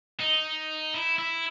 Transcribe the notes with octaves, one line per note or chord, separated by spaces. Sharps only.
D#4
E4
E4